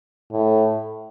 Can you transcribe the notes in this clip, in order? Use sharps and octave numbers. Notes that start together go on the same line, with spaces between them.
A2